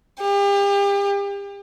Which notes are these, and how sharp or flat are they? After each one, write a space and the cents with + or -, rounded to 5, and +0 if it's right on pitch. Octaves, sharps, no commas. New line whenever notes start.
G4 +35